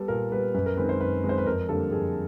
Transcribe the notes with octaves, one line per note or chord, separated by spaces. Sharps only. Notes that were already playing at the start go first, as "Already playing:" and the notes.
Already playing: G3 B3 A4
A#2 A#4
G3 B3 B4
F#2 B4
A#4
D#3 G#3 C4 B4
C5
F#2 B4
D#3 G#3 C4
C5
B4
F2 A#4
D3 G3 A#3 A4
F2 G#4